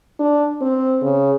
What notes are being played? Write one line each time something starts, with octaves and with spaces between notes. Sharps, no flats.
D4
C4
C#3